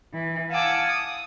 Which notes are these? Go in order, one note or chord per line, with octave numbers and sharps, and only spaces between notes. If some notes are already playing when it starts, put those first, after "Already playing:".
E3
F5 F#5 G#5 A5 D6 E6
D#6